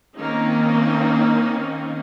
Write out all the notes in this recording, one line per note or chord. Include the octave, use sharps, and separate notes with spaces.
D#3 A#3 C4 C#4 D#4